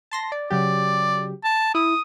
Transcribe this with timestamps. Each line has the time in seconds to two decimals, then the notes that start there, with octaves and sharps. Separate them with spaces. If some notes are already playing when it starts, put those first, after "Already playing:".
0.11 A5 C6 A#6
0.32 D5
0.50 C#3 F#3 G4 D5
1.44 A5
1.75 E4 D#6